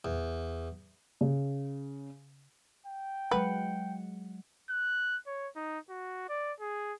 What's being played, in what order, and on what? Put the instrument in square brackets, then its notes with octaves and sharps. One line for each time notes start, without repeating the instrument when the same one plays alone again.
[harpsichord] E2
[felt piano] C#3
[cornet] G5
[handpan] F#3 G#3 F#5 [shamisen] B4
[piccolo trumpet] F#6
C#5
D#4
F#4
D5
G#4